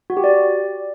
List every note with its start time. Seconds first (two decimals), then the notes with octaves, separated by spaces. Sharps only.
0.10 F#4
0.17 G4
0.24 D5